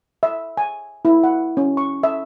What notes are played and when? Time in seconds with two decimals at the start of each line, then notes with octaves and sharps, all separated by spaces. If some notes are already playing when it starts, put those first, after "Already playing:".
0.23 E5
0.57 G#5
1.05 E4
1.24 F#5
1.57 C#4
1.77 C#6
2.03 E5